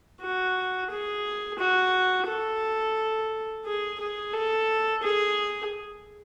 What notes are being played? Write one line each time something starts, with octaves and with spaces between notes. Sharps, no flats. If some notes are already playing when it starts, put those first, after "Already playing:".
F#4
G#4
F#4
A4
G#4
G#4
A4
G#4